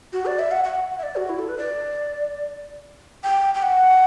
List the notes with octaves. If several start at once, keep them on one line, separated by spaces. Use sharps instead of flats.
F#4
D5
E5
F#5
F#5
F#5
E5
D5
F#4
E4
A4
B4
D5
G5
G5
F#5